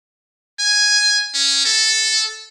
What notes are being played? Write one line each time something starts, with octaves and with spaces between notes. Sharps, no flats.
G#5
C#4
A4